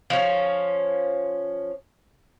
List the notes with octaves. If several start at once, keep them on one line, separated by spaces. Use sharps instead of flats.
F3 C#4